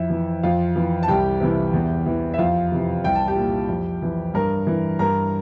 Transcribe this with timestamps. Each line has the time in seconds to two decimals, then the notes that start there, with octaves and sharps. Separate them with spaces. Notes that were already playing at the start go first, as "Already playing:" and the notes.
Already playing: F2 E4 E5
0.10 E3
0.43 F2 F4 F5
0.76 E3
1.03 A5
1.08 C2 G4 G5
1.41 C3 E3
1.73 E2
2.06 E3
2.34 E5
2.38 F2 F4 F5
2.72 C3 E3
3.04 C2 G5
3.15 A5
3.28 G4 G5
3.36 A#2
3.69 F2
4.02 E3
4.34 G2 A#4 A#5
4.67 E3
4.99 G2 A#4 A#5